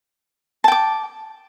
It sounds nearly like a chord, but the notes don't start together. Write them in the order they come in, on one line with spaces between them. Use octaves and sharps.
A5 G5 D6